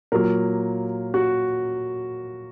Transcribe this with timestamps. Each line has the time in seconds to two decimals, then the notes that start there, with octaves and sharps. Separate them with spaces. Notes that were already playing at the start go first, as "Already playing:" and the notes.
0.12 A#2 F#3 A#3 A#4
1.14 F#4